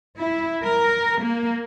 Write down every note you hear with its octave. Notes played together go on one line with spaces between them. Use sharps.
E4
A#4
A#3